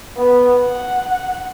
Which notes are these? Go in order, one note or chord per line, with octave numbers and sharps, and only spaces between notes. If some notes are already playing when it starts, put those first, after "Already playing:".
B3
F#5